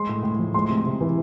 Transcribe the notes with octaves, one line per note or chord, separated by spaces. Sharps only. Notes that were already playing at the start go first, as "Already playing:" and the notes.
Already playing: G#3 C6
A2
A2
F3
G#3 C6
C3
C3
E3